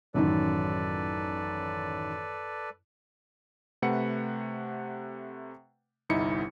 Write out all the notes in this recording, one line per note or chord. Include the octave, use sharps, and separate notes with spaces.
A1 F#2 D#3 A4 B4 D5
C3 A3 B4 F#5 C#7
G1 C2 D#4 E4 C#7